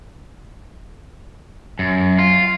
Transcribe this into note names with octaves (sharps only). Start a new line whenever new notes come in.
F#2
F4